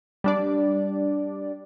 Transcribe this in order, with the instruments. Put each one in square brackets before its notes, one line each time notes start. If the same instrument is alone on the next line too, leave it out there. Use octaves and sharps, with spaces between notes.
[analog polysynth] G3 D4 D5